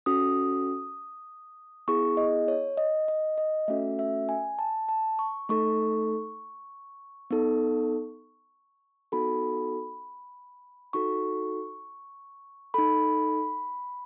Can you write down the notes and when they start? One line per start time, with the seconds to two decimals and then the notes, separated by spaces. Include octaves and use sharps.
0.06 C#4 F#4 A4 D#6
1.88 B3 E4 G#4 C#6
2.17 D#5
2.48 C#5
2.77 D#5
3.08 D#5
3.38 D#5
3.68 A3 C#4 F#4 A4 E5
3.99 E5
4.29 G#5
4.59 A5
4.89 A5
5.19 C#6
5.49 A3 D#4 A4 C#6
7.31 B3 D#4 A4
9.12 B3 D#4 F#4 A4 B5
10.93 D#4 F#4 A4 C#6
12.74 D#4 A4 B5